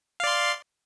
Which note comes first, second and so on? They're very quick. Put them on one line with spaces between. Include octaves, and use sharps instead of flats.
F5 D5 C6